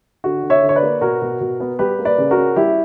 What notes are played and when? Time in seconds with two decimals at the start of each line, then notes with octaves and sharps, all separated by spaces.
0.24 D3 F#4
0.43 D3
0.50 C#5 E5
0.62 D3
0.69 C#5
0.76 B4 D5
0.83 A#3
1.01 B2 F#4 A#4
1.22 B2
1.41 B2
1.60 B3
1.79 G3 G4 B4
1.99 A#3
2.05 B4 D5
2.18 C#3
2.31 F#4 A#4
2.37 C#4
2.56 G3 E4 G4